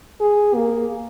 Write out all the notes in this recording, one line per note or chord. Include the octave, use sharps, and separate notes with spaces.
G#4
A#3